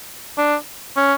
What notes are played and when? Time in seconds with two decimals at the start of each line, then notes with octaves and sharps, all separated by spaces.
0.37 D4
0.96 C#4